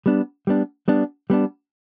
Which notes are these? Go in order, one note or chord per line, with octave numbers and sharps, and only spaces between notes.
G3 B3 D4
G3 B3 D4
G3 B3 D4
G3 B3 D4